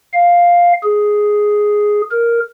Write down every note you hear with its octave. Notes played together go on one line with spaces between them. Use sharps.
F5
G#4
A#4